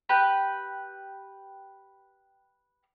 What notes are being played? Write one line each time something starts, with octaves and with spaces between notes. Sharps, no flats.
G4 B4 G5